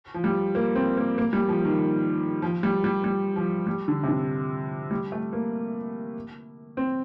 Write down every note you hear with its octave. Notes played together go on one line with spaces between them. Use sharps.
F3
G3
A#3
C4
A#3
A#3
G3
F3
D#3
F3
G3
G3
G3
F3
G3
D3
C3
D3
G3
A3
A#3
C4